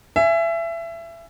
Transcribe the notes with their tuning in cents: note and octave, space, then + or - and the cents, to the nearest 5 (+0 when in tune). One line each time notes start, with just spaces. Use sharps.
E5 +25 G#5 +0